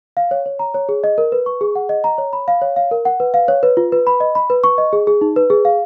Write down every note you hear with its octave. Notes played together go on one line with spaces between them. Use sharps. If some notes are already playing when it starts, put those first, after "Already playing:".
F5
C#5
C#5
A#5
C#5
G#4
D#5
A#4
B4
C#6
G#4
F#5
D#5
A#5
C#5
B5
F5
C#5
F5
A#4
F#5
B4
F5
C#5
B4
F4
B4
B5
D#5
B5
B4
C#6
D#5
G#4
G#4
D#4
B4
G#4
F5